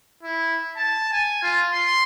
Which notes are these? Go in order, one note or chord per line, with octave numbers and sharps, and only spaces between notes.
E4
A5
G#5
F4
C6